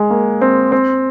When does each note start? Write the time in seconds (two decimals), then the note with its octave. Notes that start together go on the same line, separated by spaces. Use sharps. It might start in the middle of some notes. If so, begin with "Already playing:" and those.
Already playing: G#3
0.10 A#3
0.41 C4
0.72 C4